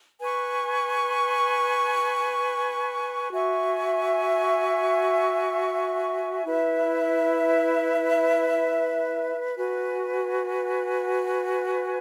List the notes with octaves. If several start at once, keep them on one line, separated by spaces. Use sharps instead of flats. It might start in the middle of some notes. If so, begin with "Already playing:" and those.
B4 G#5 C#6
F#4 E5 G#5 C#6
E4 B4 E5
F#4 B4 G#5